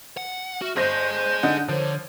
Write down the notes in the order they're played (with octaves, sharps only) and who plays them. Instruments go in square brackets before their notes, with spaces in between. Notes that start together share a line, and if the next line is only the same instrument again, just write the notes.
[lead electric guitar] F#5
[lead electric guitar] F#4 [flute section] E5 F6
[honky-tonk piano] G1 C5 A#6 [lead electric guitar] G#4 D#5 [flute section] G6
[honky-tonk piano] D3 D#4 F#5
[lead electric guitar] D3 [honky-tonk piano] F3 [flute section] A#4 C#5